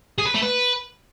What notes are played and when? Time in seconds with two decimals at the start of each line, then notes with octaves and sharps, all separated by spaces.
0.18 G#4
0.26 B4
0.34 A3
0.42 B4